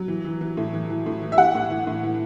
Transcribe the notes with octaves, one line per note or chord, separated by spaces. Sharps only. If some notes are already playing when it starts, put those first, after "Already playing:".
Already playing: F#3
E3
E3
E3
A2
E3
E3
A2
E3
E5
E3 F#5
A2
E3
A2
E3